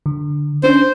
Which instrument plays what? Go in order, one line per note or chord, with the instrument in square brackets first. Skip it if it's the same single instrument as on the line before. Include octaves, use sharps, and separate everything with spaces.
[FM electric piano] D3
[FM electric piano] C#4 D4 [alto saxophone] C5